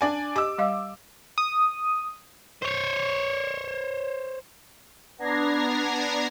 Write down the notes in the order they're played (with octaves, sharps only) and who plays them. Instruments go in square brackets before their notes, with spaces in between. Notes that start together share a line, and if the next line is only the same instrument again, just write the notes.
[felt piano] D4 D5 G#5
[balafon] G4 D#5 [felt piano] D6 E6
[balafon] G3 D#5 F5
[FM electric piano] D#6
[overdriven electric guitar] C5 C#5
[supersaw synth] B3 D4 A#5 G#6 A#6 C7